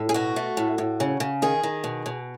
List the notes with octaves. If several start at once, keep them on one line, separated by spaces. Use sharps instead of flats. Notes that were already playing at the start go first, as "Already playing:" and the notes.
Already playing: A2
G#4
B2 F#4
A3
A2
A2
C#3
C#3
D#3 G#4
D#3
B2
B2